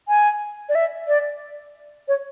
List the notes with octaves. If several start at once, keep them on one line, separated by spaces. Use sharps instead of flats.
G#5
D5
E5
D5
C#5